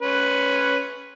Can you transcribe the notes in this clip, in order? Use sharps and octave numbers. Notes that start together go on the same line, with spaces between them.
C#4 B4